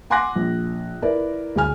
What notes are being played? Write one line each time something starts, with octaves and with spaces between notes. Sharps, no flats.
F#5 G#5 C6 D6 F#6 A#6
A#1
E4 A#4 B4 D5
D2 G#4 G#5 F6